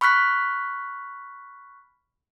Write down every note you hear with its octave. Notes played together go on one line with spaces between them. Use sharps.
B5 C#6 F6 F#6 B6